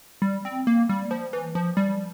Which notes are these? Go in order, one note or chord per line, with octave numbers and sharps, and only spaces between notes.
G3
C4
A#3
G3
F3
E3
F3
G3